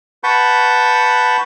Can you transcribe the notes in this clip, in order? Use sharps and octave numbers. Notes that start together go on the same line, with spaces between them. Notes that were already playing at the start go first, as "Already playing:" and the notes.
B4 F#5 A5 B5 C#6 G6